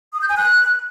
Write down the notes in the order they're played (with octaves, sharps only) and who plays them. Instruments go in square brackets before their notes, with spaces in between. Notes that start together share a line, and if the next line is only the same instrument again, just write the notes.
[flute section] D#6
G6
G#5
F#6